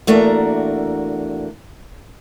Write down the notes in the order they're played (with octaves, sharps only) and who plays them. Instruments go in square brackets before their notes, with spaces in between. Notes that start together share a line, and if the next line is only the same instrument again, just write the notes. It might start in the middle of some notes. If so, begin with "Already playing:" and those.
[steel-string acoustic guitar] E2 A3 A#3 D4 F#4 A#5